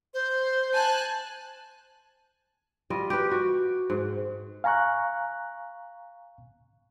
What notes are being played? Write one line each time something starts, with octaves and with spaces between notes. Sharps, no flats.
C5
G#5 A5 F#6
G3 F4 D#5
G4 B4
F#4
G#2
F5 G#5 A#5 C#6 F#6